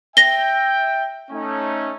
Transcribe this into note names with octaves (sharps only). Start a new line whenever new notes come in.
E5 G5 A#6 G7
A3 C#4 D#4